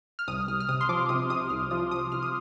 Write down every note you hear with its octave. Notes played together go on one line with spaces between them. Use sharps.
F6
C2 D#6
C2 F6
F6
C3 D#6
C6
F3 D6
C3 D#6
C3 D#6
C2 F6
F3 D#6
F3 D#6
C2 F6
D#6